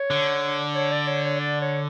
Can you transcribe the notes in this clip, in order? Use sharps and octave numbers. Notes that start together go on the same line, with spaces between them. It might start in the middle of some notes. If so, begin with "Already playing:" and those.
Already playing: C#5
D3
C#5
D5
C#5
C#5
D5
C#5